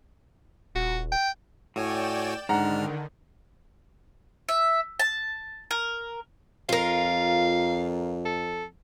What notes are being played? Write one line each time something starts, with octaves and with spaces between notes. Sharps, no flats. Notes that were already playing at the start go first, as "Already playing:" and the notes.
D#1 F#4
G5
A2 F#4 C#5 D5 G5 G#5 E7
G#2 D3 D#3 D4 F#5 A#5 F6
E5
A5
A#4
F2 F4 A#4 F5
A4